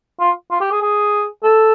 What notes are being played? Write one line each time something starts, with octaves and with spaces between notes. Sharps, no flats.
F4
F4
G4
G#4
G#4
A4